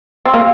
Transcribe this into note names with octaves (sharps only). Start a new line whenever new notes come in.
C4
A#3